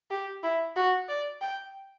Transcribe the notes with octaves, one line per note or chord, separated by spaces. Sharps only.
G4
E4
F#4
D5
G5